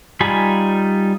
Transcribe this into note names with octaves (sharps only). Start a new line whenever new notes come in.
G3 D#4 F4 G#5 B5